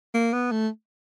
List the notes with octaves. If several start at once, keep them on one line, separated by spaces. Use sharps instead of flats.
A#3
B3
A3